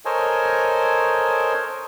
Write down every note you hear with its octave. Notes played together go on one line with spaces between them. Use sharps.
A4 A#4 C5 C#5 D#5 G#5